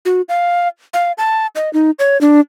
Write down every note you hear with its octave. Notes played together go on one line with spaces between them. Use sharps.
F#4
F5
F5
A5
D#5
D#4
C#5
D4